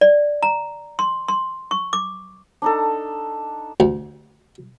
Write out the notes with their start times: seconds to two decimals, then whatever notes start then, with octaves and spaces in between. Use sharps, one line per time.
0.01 D5
0.43 A#5
0.99 C6
1.28 C6
1.71 C#6
1.93 D6
2.62 D4 D#4 A4
3.80 D2